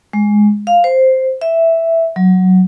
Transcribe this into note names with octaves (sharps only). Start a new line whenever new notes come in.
G#3
F5
C5
E5
F#3